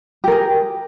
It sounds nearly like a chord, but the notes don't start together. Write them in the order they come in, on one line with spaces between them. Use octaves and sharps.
G4 A#4 G#4